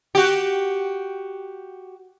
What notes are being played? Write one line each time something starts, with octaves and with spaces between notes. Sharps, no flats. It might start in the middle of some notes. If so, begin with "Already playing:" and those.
F#4 G4